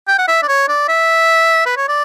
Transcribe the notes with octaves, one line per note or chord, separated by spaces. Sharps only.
G5
F#5
E5
D5
C#5
D5
E5
B4
C#5
D5